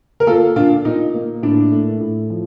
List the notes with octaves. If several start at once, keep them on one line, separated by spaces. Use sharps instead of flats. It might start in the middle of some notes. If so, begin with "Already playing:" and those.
A#4
A#3 F4 A4
A#2 D4 F4
A#2 D#4
A#3
A2 D4
A3
A2
F3